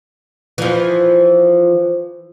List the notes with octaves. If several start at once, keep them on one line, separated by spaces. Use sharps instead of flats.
E3 F3